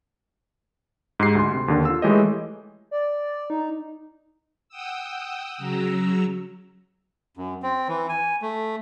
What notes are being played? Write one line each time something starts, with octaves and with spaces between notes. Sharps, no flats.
G#2 D#4 G4 C7
D2 C6
C3
D#2 D3
F4 E6
E3 G#3 A3 G4 C#5 D#5
D5
D#4
F#5 G5 D#6 E6
C#3 F#3 A#5 E6
F#2
C4
E3
G#5
A3